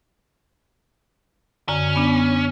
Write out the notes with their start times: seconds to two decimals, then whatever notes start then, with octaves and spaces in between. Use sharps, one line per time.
1.68 F#2 D3 C#4
1.96 B3 D4